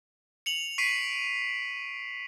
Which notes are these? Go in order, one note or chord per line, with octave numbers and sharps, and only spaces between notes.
C#7 F7 F#7
C#6 B6 C7 D7 D#7